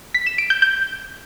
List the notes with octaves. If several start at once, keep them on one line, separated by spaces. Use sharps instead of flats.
B6
E7
D7
G6
G6